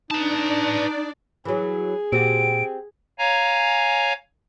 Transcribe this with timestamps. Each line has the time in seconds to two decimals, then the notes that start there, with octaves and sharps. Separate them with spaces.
0.11 D4 D#4 B4 D5 A5
1.45 E3 F#3 G#4
2.12 A#2 C4 F#4 G4 D7
3.19 C#5 F5 G#5 A#5